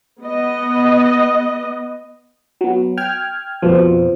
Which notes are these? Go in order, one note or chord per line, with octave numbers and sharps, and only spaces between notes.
B3 D#5
F#3 B3
G5 F6 G#6
F2 B2 F3